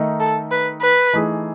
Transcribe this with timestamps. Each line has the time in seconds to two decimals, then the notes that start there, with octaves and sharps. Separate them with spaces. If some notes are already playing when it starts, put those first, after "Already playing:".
Already playing: D#3 A3 D#4
0.20 A4
0.51 B4
0.81 B4
1.13 E3 A3 D#4 G#4